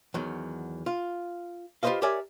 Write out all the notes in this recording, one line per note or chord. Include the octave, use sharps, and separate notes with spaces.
E2 D#3 F#3
F4
F4 G4 B4 C5 D#5 F5
G4 A#4 C#5 D5 E5 G#5